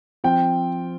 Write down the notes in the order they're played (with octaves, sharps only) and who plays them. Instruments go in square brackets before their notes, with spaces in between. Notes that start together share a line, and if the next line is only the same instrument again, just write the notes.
[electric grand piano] F3 C4 F4 [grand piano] G5